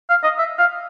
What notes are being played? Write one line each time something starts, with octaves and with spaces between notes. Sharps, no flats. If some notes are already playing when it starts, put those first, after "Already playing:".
F5
D#5
E5
F5